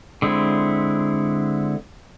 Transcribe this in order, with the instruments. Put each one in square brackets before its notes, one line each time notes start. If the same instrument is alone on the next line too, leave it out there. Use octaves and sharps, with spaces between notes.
[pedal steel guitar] D3 G#3 C4 E4